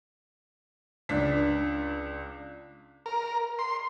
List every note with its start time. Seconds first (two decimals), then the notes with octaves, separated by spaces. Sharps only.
1.09 C#2 D4 B6
3.06 A#4
3.59 C6